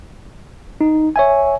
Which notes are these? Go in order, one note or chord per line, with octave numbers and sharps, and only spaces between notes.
D#4
C#5 E5 G#5